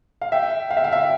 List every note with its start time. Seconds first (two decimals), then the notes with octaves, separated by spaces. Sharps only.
0.22 F5
0.32 E5 G5
0.71 F5
0.77 E5
0.84 F5
0.93 E5